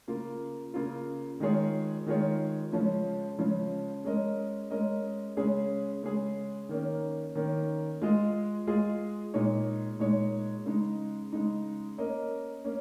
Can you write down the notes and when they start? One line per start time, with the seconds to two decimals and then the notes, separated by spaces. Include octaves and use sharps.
0.08 C#3 A#3 F4
0.74 C#3 A#3 F4
1.40 D#3 G#3 F4 G#4 C#5
2.06 D#3 G#3 F4 G#4 C#5
2.72 C#3 F3 G#3 C#4
3.39 C#3 F3 G#3 C#4
4.05 G#3 C#4 A#4 D#5
4.71 G#3 C#4 A#4 D#5
5.37 C#3 G#3 C#4 G#4
6.03 C#3 G#3 C#4 G#4
6.69 D#3 A#3 C#4
7.35 D#3 A#3 C#4
8.02 G#3 F4 G#4 D#5
8.67 G#3 F4 G#4 D#5
9.34 A#2 G#3 D#4 C#5
9.99 A#2 G#3 D#4 C#5
10.66 C#3 G#3 D#4
11.32 C#3 G#3 D#4
11.98 A#3 C#4 A#4 D#5
12.64 A#3 C#4